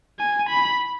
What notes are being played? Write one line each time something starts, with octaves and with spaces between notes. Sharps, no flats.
G#5
B5